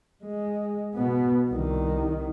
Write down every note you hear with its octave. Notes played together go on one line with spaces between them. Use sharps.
G#3
B2 B3
C2 D#3